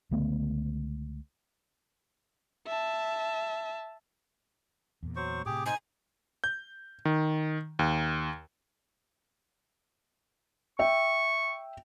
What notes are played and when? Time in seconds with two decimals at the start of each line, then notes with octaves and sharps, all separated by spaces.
0.11 C#2 D3 A3 B3
2.67 E5 A5
5.03 E2 A#2
5.16 F#3 C5 C#6
5.46 A2 C3 G4 G#4 D6
5.66 D#4 C5 G#5
6.44 G6
7.05 D#3
7.79 D#2
10.79 E5 G5 C#6